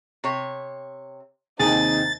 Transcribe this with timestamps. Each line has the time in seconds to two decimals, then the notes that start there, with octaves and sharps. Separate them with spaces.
0.24 C3 C#5
1.59 D#2 C3 D#3 C4 D#4 G#4 A6